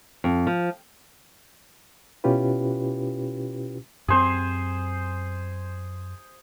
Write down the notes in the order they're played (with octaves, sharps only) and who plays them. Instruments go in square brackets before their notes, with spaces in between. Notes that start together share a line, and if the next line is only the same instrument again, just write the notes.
[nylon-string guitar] F2
F3
[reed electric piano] B2 C#4 E4 F4 G4 B4
[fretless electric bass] F#2 C4 [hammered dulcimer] G#4 C5